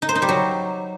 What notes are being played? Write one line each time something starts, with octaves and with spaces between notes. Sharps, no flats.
D#4
C5
D#4
G3
F#3